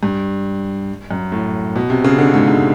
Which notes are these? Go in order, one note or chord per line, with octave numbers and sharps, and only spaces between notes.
G2
F#2
A2
B2
C3
C#3
D3
G#2
G#2